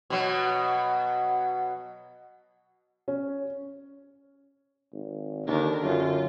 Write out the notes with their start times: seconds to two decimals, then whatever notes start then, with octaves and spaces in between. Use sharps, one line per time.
0.10 B2 F#3
3.08 C#4
4.93 G#1
5.47 D#2 D3 D4 A#4
5.83 F#2 F4